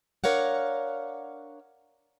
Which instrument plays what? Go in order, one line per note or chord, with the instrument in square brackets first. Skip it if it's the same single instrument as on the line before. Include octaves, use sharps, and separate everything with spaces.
[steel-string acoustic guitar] D4 A#4 C#5 F5 F#5